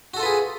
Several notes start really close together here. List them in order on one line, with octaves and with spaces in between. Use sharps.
F#4 A4 F4 B4 G#4